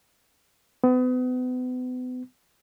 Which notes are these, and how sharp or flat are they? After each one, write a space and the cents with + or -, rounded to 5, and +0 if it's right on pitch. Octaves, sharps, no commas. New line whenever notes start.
B3 +35